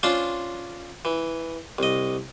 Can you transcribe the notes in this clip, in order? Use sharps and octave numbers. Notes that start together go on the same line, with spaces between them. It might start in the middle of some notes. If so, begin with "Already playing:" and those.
C#4 D4 F4 C5 D5
E3
C2 D#5